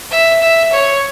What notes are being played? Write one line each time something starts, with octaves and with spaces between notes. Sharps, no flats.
E5
E5
C#5